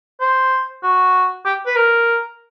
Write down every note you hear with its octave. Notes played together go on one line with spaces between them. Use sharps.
C5
F#4
G4
B4
A#4